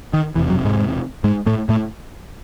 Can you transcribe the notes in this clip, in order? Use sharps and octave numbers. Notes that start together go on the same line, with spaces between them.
D#3
E1 E2 C3 E3
F#2 F#3
G#2 G#3
G#2 G#3
A2 A3
A2 A3